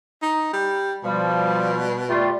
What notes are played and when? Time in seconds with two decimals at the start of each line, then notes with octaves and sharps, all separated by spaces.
0.22 D#4
0.53 G3
1.03 B2 F3 G3
2.08 G3 A3 F4